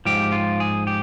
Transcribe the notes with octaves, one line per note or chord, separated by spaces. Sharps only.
G#2 F3 G4
F4
G#4
G4